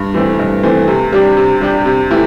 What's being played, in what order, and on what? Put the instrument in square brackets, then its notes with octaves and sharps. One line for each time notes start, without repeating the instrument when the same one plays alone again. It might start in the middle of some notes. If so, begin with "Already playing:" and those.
Already playing: [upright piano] G2
E3 A3 C4
G2
E3 A3 C4
C3
G3 D4 G4
C3
G3 D4 G4
C3
E3 A3 E4 G4